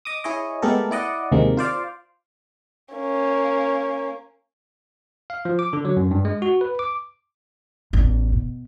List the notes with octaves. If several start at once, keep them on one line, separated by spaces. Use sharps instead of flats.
D#5 D6 D#6
E4 G#4 C#5 D#5
G#3 A3 B3 G4 A4 A#4
E4 D5 D#5 F#5
D#2 C3 D#3 G#3 A#3
F4 C5 D5 F5
A#3 C#4
F5
F3
D6
D3
F#3
F#2
G2
G#3
F#4
B4
D6
A1 E2
B2